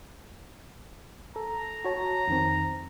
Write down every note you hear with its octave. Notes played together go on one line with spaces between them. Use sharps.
A4 A#5
F#4 C#5 A5
F2 D#3 C4